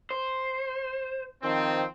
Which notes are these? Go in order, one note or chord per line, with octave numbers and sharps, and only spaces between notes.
C5
D#3 F3 C4